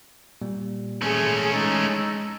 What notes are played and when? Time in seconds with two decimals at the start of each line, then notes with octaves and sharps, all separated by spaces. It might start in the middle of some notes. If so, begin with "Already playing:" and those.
0.42 A#2 G3 A#3
1.02 A3 C#4 G#4 G#5 A5
1.53 G#3 D#4 A5 A#5 E6 A6